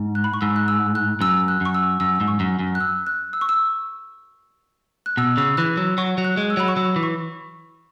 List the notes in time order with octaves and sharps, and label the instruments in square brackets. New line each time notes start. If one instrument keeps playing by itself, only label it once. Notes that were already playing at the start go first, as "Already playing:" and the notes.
Already playing: [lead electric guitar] G#2
[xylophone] F#6
B5
C#6
[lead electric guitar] G#2 [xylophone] E6
[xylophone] F#6
E6
F#6
[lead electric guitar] F#2 [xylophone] E6
[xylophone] F#6
[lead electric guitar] F#2 [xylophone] C#6
[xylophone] E6
[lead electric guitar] F#2 [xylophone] E6
[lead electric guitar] G#2 [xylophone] E6
[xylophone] C#6
[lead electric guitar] F#2
F#2
[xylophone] F#6
E6
F#6
E6
C#6
E6
F#6
[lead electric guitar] B2 [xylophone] E6
[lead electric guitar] C#3 [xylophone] E6
[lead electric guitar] E3 [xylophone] F#6
[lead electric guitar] F#3 [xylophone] E6
[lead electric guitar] F#3 [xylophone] C#6
[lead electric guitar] F#3
[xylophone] F#6
[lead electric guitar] G#3
[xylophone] E6
[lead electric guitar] F#3 [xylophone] B5
[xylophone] C#6
[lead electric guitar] F#3 [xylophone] E6
[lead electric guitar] E3
[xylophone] C#6